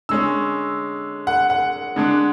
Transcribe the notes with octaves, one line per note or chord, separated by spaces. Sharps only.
D3 G#3 C#4 E6
F#5
F#5
D3 G#3 D4